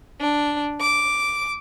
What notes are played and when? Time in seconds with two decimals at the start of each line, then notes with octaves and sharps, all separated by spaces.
0.20 D4
0.80 D6